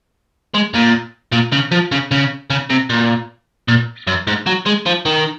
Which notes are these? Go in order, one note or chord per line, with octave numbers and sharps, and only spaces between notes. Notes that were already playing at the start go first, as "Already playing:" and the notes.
G#3
A#2
A#2
C#3
F3
C#3
C#3
C#3
C3
A#2
A#2
F#2
G#2
F#3
G#3
F3
D#3